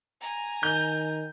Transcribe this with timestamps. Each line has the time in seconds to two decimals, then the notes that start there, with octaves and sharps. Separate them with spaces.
0.21 G#5 A#5
0.63 D#3 G6